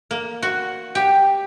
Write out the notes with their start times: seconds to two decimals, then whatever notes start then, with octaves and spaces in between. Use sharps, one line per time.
0.11 A#3
0.42 F#4
0.95 G4